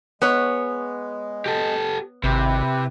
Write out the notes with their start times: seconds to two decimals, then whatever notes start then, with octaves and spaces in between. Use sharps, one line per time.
0.22 G#3 B3 C#5
1.46 G4 A4
2.24 G#1 C3 E4 G4 B4